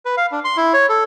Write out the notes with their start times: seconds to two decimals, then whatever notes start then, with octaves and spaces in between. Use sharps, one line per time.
0.06 B4
0.17 F5
0.32 D4
0.44 C6
0.57 E4
0.74 C#5
0.89 A4